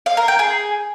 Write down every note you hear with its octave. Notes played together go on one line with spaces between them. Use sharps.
F5
A#4
G5
G#4